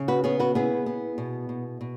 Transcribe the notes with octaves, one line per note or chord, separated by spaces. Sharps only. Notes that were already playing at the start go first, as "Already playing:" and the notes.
Already playing: C#3
F#4 B4
B3 G#4 C#5
F#4 B4
B3 E4 G#4
B3
B2
B2
B2